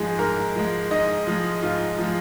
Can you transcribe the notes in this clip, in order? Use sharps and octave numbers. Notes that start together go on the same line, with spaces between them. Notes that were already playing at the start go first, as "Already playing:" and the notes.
Already playing: G#2 F3 G#3 G#4
G#2 A#4
F3 G#3
G#2 D#5
F3 G#3
G#2 F4
F3 G#3